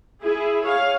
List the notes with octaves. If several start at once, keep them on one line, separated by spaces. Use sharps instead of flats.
E4 G#4
G#4 C#5 F5